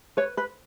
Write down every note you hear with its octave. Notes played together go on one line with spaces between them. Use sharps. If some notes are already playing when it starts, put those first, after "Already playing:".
B4 C#5
B4